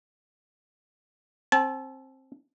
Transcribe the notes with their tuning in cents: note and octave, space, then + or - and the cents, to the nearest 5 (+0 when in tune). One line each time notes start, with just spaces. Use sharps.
C4 +20 A5 -30